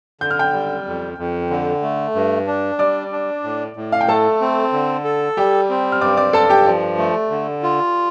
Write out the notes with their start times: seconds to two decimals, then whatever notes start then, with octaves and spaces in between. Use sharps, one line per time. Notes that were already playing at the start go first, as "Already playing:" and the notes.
0.21 D3 G6
0.31 F6
0.39 G5 G6
0.53 G3
0.86 F2
1.18 F2
1.50 D3
1.82 A3
2.15 G2
2.47 D4
2.79 G3 D5 D6
3.12 D4
3.44 A2
3.76 A2
3.92 F5
4.01 G5
4.08 A3 A4 A5
4.41 C4
4.72 D3
5.05 A4
5.37 G3 G4 G5
5.70 C4
5.92 F6
6.01 G2 D5 D6
6.17 D5 D6
6.33 G2 A4 A5
6.49 G4 G5
6.66 F3 D5
6.98 A3
7.30 D3
7.63 F4